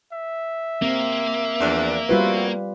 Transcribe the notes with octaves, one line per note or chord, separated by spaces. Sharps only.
E5
A#3 C4
E2 F3 D4
G3 B3 C4 F4 F#4 B4